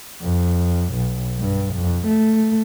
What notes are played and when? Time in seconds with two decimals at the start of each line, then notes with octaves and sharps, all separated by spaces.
0.22 F2
0.93 B1
1.39 G2
1.74 F2
2.07 A3